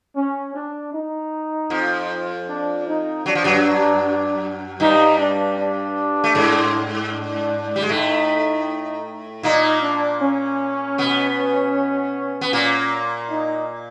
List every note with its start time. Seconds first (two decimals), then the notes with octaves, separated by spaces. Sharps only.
0.16 C#4
0.55 D4
0.93 D#4
1.70 F2 F3
2.48 D4
2.87 D#4
3.26 F#3 D4
3.35 F3
3.44 F#2 F#3
4.80 G2 G3 D#4
5.19 D4
5.58 D4
6.24 A3
6.35 G#2 G#3
7.12 D4
7.76 G3
7.82 G#3
7.89 A2 A3 D#4
9.43 A#2 A#3 D#4
9.83 D4
10.21 C#4
10.98 B2 B3
12.41 B3
12.53 A#2 A#3
13.30 D#4